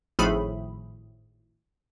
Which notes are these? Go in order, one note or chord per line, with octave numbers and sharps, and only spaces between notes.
G#1 A2 F3 A3 G#4 B5